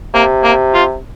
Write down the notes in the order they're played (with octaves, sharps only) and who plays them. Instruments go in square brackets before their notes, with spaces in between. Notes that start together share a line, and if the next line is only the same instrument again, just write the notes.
[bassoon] C3 [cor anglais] A#3
[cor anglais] A#3
F4